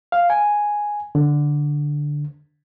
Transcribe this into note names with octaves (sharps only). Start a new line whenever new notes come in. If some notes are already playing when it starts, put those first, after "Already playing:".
F5
G#5
D3